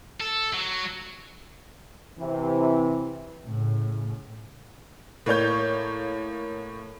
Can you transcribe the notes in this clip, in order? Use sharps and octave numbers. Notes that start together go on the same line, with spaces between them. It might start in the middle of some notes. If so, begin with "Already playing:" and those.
A4
F#3
C3 E3
A2 C#3
A2 A#3 C#5 G6